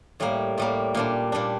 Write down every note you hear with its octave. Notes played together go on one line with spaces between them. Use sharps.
A2 G3 A#3
A2 G3 A#3
A#2 G3 D4
A#2 G3 D4